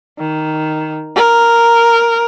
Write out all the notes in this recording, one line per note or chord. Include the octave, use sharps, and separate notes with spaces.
D#3
A#4